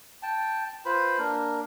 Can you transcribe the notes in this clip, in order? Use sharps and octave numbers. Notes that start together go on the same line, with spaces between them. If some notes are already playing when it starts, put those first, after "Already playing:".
G5 A5
F4 B4 C5 B5
A#3 D4 A#4